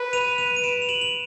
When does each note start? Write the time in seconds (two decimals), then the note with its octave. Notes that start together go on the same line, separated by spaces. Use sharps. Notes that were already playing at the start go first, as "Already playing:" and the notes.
Already playing: B4
0.13 D#7 F7
0.38 D#7 F7
0.57 D#7
0.63 D7 E7
0.82 F7
0.89 E7 F#7
1.01 F#7